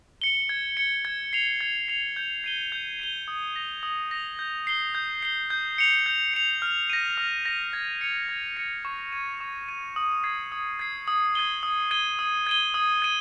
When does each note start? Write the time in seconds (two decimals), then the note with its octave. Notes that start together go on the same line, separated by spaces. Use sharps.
0.22 C#7 G7
0.49 G#6
0.77 C#7 G7
1.05 G#6
1.33 C7 F7
1.61 G#6
1.88 C7 F7
2.16 G6
2.44 C7 D#7 G7
2.72 G6
3.00 C7 D#7 G7
3.28 D#6
3.55 A#6 F7
3.83 D#6
4.11 A#6 F7
4.39 G6
4.67 C7 G7
4.95 G6
5.23 C7 G7
5.50 G6
5.78 C#7 F7
6.06 G6
6.34 C#7 F7
6.62 F6
6.90 A#6 D#7
7.18 F6
7.45 A#6 D#7
7.73 G#6
8.01 C#7 F7
8.29 G#6
8.57 C#7 F7
8.85 C#6
9.12 G#6 D#7
9.41 C#6
9.68 G#6 D#7
9.96 D#6
10.24 G#6 C7
10.52 D#6
10.79 G#6 C7
11.08 D#6
11.35 G#6 D#7 G7
11.63 D#6
11.91 G#6 D#7 G7
12.19 D#6
12.47 G#6 D#7 G7
12.74 D#6
13.02 G#6 D#7